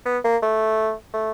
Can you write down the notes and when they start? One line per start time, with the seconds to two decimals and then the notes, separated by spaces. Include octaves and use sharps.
0.06 B3
0.24 A#3
0.42 A3
1.14 A3